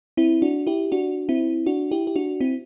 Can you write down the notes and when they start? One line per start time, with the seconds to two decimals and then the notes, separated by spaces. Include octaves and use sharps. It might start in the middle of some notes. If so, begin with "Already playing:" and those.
0.17 C4 E4
0.42 D4 F#4
0.67 E4 G4
0.92 D4 F#4
1.29 C4 E4
1.66 D4 F#4
1.91 E4 G4
2.07 G4
2.16 D4 F#4
2.40 C4 E4